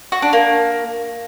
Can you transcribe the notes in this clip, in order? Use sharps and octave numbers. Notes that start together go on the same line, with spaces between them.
F#4
D4
A#3